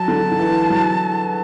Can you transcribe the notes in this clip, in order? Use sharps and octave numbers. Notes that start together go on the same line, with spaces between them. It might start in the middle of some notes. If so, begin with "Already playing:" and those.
Already playing: F#3 A5
D3
D3
E3
F#3